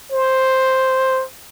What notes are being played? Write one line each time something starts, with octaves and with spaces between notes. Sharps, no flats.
C5